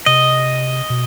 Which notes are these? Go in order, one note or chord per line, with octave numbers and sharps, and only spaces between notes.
C3 D#5
B2